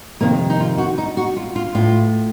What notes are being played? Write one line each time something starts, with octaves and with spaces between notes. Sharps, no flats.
F2 C3 D#3 A#3
D#4
F4
F#4
D#4
F#4
F4
F4
A2 F4